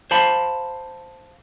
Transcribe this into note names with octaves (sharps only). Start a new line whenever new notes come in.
C5 F5 A5 B5